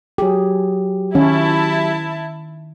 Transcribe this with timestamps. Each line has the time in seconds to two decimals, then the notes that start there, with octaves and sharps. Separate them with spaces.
0.18 F#3 G4 G#4
1.15 D#3 C#4 E4 A5